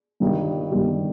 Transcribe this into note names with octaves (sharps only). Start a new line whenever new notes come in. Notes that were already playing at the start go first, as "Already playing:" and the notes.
G1 G2 D#3 G3
G1 G2 D#3 G3